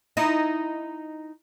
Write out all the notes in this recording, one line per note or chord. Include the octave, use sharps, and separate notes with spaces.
D#4 E4